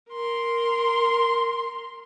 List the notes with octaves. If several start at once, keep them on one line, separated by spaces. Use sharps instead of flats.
A#4 C6